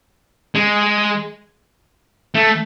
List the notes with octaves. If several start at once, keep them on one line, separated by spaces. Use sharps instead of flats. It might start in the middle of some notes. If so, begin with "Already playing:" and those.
G#3
A3